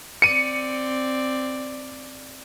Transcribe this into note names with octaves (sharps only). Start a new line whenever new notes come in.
C4 D5 C#7 D#7